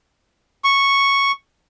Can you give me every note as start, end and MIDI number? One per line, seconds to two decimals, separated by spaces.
0.64 1.32 85